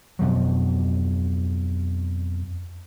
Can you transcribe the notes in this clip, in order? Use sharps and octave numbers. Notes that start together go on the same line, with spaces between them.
F2 B2 F3 F#3